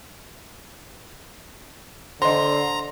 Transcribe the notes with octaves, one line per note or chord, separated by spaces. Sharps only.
D3 C5 D#5 A#5 C6